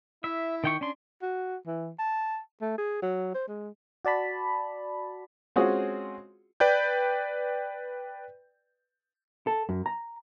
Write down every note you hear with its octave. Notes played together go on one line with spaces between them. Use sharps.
E4 E5
D#3 G5 C#6
C#4 D4 C6
F#4
E3
A5
A3
G#4
F#3
C5
G#3
F#4 D5 A5 B5
G#3 C4 C#4 F4 F#4 G#4
B4 D5 G5 G6
A4
F#2
A#5